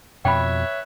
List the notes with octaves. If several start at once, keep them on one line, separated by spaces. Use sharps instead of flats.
F2 B2 B4 C#5 E5 G5 B5